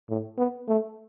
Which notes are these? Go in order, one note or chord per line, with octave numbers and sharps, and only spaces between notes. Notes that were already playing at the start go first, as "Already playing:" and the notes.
A2
B3
A3